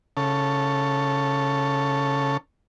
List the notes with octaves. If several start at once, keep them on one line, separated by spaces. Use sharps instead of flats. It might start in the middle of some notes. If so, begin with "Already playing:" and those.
C#3 A4